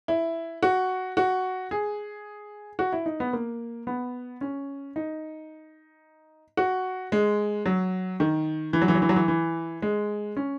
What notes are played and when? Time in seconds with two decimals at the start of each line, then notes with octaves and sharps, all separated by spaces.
0.08 E4
0.63 F#4
1.17 F#4
1.71 G#4
2.79 F#4
2.93 E4
3.06 D#4
3.20 B3
3.33 A#3
3.87 B3
4.41 C#4
4.96 D#4
6.57 F#4
7.12 G#3
7.66 F#3
8.20 D#3
8.73 E3
8.82 F#3
8.88 E3
8.95 F#3
9.02 E3
9.09 F#3
9.16 E3
9.28 E3
9.82 G#3
10.37 C#4